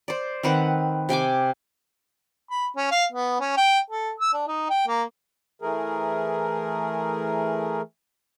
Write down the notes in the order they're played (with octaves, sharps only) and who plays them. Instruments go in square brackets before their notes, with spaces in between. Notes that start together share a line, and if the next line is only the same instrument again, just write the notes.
[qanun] C5 D5
D#3 C4 B4 F#5
C3 G5 G#5 D6
[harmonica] B5
C#4
F5
B3
C#4
G5
A4
E6
D4
D#4
G5
A#3
[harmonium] E3 A3 G#4 A#4